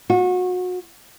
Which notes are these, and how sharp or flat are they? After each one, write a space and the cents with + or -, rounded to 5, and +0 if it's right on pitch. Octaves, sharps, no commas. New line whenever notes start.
F#4 -30